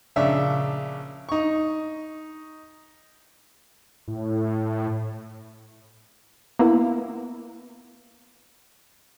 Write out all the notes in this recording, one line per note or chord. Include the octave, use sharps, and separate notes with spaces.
A#1 C#3 D4 E5
D#4 C#6
A2
A#3 B3 E4